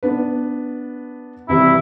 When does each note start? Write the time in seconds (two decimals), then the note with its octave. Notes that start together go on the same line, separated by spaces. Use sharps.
0.03 B3 D4 B4
1.49 C3 E3 G3 E4